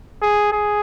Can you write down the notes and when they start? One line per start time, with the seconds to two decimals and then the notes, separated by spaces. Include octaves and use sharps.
0.22 G#4
0.52 G#4